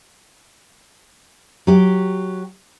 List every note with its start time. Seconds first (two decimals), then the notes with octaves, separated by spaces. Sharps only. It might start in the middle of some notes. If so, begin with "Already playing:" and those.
1.67 F#3 G4